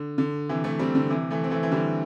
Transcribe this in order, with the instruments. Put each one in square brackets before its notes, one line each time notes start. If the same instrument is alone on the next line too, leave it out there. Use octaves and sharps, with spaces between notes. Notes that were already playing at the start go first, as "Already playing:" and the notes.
Already playing: [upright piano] D3
D3
C3 E3
E3 A3
G3 C4
D3
C3 E3
E3 A3
C4
E3 A3
E3
D3 G3